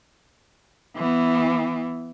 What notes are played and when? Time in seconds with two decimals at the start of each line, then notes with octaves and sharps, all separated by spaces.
0.96 E3 B3